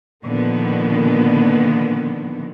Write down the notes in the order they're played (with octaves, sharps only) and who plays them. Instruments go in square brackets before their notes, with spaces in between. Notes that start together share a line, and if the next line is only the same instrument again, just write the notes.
[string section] A#2 D3 D#3 F3 B3